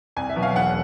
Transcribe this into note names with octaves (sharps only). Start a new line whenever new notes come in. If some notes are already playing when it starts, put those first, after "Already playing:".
C2 G#5
E5
B2 F#3
F5
E1 F#5